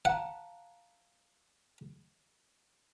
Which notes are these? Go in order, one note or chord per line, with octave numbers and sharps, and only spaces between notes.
F5 F#5 A5 A#5